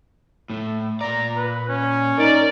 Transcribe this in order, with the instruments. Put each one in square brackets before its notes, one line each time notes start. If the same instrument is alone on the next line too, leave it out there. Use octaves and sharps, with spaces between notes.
[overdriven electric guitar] A2 A3
[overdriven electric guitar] A#2 D5 [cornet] A#5
[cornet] B4
C#4
[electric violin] D#4 A#4 [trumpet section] D5